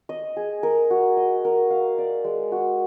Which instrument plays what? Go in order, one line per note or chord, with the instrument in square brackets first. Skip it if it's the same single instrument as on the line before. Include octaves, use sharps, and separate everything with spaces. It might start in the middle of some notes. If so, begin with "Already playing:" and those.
[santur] D#5
G#4
A#4
F#4
D#5
A#4
F5
D5
G#3
F#4